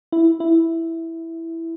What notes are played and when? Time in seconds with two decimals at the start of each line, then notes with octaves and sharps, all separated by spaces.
0.12 E4
0.40 E4